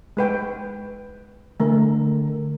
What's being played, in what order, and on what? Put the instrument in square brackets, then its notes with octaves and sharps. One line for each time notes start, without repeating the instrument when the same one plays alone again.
[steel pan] G#3 B4 G5
[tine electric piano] D3 A#4 [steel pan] A3